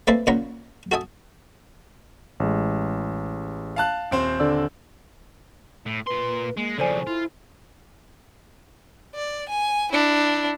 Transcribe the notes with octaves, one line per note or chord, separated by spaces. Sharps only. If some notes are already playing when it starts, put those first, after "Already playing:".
A3 A#3 C4 B4 D5 E5
A#2 C#3 C#5 F#5 A#5 B5
F#4 A4 E5 G#5 D#6
A1 G#3
F5 A5 F#6
D#1 C4 C5
D3 D5 E6
A2
A#2 B4 C6
G#3 A#3
F2 C#3 A4 C5 D5 G#5
E4 F4
D5
G#5
D4 E4